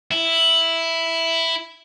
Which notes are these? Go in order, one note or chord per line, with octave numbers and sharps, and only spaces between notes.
E4